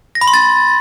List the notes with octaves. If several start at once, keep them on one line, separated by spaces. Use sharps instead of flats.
A#6
B5
C6
A6